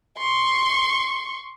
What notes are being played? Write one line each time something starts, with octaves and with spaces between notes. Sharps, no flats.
C6 C#6